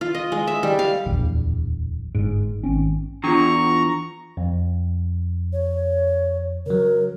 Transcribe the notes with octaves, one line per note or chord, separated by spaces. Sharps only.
F4
D#5
G#3
E5
G3
F5
D1 A#1 E2
G1 G#2
G#1 C4 C#4
E2 D4 F4 A#5 C#6
F2
C#5
C#3 F#3 A#4